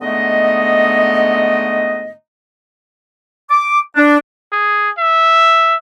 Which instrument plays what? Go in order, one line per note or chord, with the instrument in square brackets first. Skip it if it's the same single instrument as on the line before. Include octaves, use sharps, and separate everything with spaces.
[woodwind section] G#2 D3 A3 B3 D#5
D6
D4
[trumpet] G#4
E5